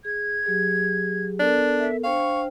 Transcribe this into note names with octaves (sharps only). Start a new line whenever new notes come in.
G#4 G#6
F#3 G4 G#4
B3 D4 A4 A#4
E5
D4 C5 F5 G5 C#6